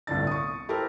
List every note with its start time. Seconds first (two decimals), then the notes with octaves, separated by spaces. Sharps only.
0.07 G1 C2 A2 D3 D4 A6
0.27 C#6 D#6
0.69 E4 G4 A4 A#4 C5